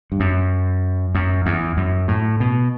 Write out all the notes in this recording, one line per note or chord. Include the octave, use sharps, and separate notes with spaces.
G2
F#2
F#2
E2
F#2
A2
B2